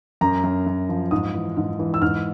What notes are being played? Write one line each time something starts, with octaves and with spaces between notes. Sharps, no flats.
F#2 A#5
F#2
F#2
F3
G#2 D#6
E3
G#2
E3
E6
G#2 F6